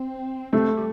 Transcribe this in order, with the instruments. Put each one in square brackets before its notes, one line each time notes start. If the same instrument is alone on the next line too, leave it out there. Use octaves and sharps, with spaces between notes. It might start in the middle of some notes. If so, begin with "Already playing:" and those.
Already playing: [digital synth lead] C4
[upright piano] A3 [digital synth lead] C4
[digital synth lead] G3